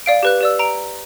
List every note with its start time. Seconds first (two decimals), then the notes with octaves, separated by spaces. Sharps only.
0.06 D5 F5 D7
0.23 G4 B4 F#6
0.41 G4 D5 E6
0.59 A#5 D7